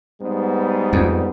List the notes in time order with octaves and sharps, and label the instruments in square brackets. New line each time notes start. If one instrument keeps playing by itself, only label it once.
[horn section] G#2 G3 B3
[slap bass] F2